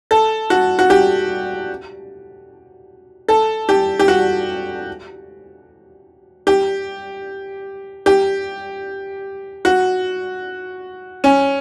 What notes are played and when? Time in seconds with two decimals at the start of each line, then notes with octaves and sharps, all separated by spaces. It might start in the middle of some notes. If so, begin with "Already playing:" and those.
0.11 A4
0.50 F#4
0.79 F#4
0.90 G4
3.28 A4
3.69 G4
3.99 G4
4.08 F#4
6.47 G4
8.06 G4
9.65 F#4
11.24 C#4